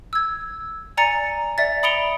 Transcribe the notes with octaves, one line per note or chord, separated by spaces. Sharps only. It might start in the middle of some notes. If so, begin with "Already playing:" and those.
E6 G#6
D5 G#5 A#5 A6 C#7
D5 E5 A6
B5 D#6 C#7 D7 F7 G7